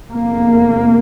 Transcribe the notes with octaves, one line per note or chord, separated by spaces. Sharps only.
F1 E2 C3 A#3